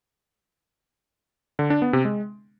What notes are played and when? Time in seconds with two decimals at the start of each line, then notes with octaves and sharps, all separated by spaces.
1.59 D3
1.70 D4
1.82 B3
1.93 C3
2.05 G#3